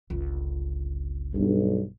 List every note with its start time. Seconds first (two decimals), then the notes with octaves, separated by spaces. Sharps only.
0.10 G1 C#2
1.34 B1 G2